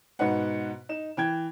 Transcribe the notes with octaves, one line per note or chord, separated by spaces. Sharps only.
G#2 B2 D#4 B4 F#5
D#4 E7
E3 G5 G#6